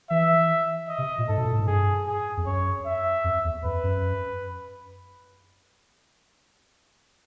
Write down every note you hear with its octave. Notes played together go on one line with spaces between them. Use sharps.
E3 E5
D#5
C3
A#2
G#2 A4
B2
A#2
A2
G#2
G2 G#4
G#4
F2
F#2 C#5
E5
F2
E2
F2 B4
F#2